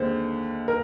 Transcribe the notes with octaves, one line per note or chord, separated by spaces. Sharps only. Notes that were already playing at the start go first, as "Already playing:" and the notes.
Already playing: D#2 D3 G#3 C4 C5
A#4